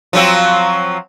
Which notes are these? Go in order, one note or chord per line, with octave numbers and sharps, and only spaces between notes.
F3 F#3 C4